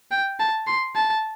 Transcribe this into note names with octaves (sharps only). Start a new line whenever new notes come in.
G5
A5
C6
A5